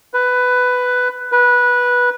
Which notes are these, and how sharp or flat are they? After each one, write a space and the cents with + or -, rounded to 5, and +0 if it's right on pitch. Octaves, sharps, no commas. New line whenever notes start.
B4 +10
B4 -15